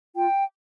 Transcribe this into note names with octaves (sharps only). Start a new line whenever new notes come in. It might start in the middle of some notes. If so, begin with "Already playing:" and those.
F4 G5